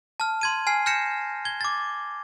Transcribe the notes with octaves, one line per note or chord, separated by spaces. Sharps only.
A5 F6
C6 G#6 D#7
G#5 F6 C7
F6 G6 A#6 C#7 E7
G#6 G7
D6 A6